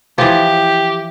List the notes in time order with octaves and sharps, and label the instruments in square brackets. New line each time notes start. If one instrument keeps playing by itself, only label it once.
[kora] E3 F3 [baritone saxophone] G4